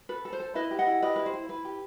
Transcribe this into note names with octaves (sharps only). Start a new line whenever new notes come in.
A4 B4
A4
C5
A4
E4 B4 D#5
G4
D#5 F#5
E4
G4 B4 D#5
E4 B4
C5
E4
E4 B4
G4